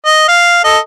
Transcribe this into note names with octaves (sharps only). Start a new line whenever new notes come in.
D#5
F5
A4 D#5